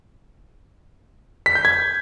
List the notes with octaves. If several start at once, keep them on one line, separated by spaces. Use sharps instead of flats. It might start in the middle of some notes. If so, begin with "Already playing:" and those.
B6
G6
G#6